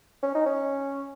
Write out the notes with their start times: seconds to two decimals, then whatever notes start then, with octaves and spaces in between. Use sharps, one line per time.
0.23 C#4
0.35 D#4
0.46 C#4